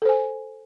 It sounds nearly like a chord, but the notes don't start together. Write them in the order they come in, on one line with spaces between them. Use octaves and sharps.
A4 C5 G#5